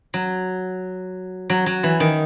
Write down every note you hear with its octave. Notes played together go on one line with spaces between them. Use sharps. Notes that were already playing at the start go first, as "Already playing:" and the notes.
F#3
F#3
F#3
E3
D#3